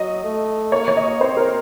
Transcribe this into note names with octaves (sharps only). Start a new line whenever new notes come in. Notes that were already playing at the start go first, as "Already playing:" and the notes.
Already playing: F#3 D#5
A3
A#3 C#5
C#5
D#5
C4 C5
A#4